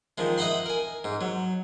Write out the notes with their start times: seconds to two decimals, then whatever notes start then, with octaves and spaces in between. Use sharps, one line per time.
0.18 D#3 F3 G#3
0.38 D#5 E5 F#5 B5 C6
0.66 A#4 G#5
1.04 G#2
1.21 F#3